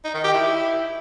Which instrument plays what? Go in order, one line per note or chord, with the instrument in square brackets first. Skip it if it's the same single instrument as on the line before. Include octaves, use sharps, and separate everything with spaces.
[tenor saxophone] D#4
D#3
G4
E4